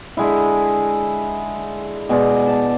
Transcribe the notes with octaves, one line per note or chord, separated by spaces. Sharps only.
D3 G#3 E4
B2 G#3 D5
A5